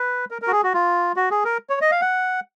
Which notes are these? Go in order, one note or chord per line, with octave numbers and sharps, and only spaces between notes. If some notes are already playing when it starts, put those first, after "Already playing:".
Already playing: B4
A#4
A#4
F#4
G#4
F#4
F4
F#4
G#4
A#4
C#5
D#5
F5
F#5